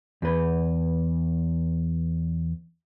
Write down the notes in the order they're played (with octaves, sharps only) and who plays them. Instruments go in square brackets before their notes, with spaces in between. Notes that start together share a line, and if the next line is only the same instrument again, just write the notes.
[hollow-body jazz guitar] E2 B4